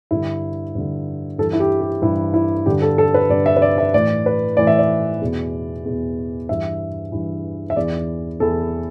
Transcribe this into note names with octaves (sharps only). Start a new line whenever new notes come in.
G2 D3 E4
G2 D3
G2 E3 A4
E4
G4
G4
G2 E3 E4
E4
G2 D3 G4
A4
A4
B4
G2 D3 D5
E5
B4
D5
E5
A2 E3 D5
B4
A2 E3 D5
E5
D5
E2 B2
E2 B2
G2 E3 E5
G2 E3
E5
E2 E3 D5
E2 E3 A4